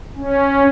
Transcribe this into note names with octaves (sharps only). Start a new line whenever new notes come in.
C#4